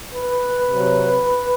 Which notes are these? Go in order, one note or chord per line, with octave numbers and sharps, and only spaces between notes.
B4
C3 F#3